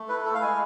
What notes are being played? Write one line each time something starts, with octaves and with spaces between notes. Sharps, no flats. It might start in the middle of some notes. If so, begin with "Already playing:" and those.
Already playing: A3
E4 B4
E4 A4
F5
G#3 G#5